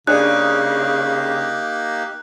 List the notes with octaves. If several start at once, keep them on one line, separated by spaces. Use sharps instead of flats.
C#3 A#3 D4 D#4 G4 G#4 C#5 F#6